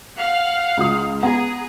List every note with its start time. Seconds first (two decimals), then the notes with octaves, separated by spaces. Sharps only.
0.17 F5 F#5
0.77 C#2 F4 D#6
1.23 B3 G#4 F#5 A#5